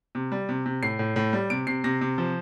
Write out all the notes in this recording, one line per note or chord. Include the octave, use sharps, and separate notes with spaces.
C3
G3
C3
C3
A2 C7
A2
A2
G3
C3 D7
C3 C7
C3 A#6
C3
F3